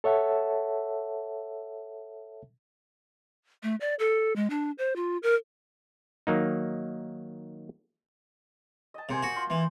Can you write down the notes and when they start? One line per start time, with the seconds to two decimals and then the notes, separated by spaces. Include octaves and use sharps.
0.04 A4 C#5 E5 F#5 A5
3.63 A3
3.81 D5
3.99 A4
4.36 G#3
4.50 D4
4.78 C5
4.96 F4
5.23 A#4
6.27 D#3 F#3 A#3 D#4
8.94 D#5 A5
9.09 C3 A#3 C5 G#5
9.23 F#4
9.36 F4 C6
9.50 E3